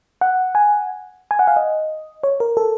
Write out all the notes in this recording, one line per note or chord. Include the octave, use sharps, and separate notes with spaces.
F#5
G#5
G#5
F#5
F5
D#5
C#5
A#4
A4